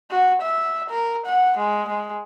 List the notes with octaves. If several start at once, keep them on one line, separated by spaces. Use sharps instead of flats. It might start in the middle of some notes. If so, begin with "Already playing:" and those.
F#4
E5
A#4
F#5
G#3
G#3